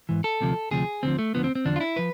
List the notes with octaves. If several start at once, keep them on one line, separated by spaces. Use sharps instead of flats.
G#2 E3
A4
D2 C3 F3
D2 C3 F3 G#4
D2 D3 F3 C4
A3
D2 D3 F3 B3
C4
C4
E2 D3 F3 D4
F4
E4
F3 B4